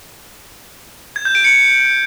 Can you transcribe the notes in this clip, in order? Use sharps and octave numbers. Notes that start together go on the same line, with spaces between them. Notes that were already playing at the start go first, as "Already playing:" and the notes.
G#6
G6
D7
C#7